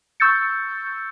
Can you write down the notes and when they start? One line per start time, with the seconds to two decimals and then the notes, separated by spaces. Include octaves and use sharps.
0.20 C#6 E6 G6 A6 C#7